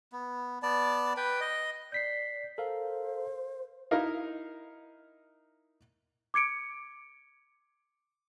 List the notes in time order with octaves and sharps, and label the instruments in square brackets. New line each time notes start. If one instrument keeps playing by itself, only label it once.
[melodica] B3
B3 D5 A5
B4 G5
D#5
[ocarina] D5 [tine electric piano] G6 B6 C7
[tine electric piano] A4 A#4 F5 [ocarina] C5
[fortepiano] D#4 E4 A#4 D#5 F5
[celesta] D6 G#6 C#7 D7